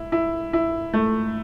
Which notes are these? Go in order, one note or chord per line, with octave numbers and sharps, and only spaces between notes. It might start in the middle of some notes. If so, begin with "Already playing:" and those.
Already playing: E4
E4
E4
A3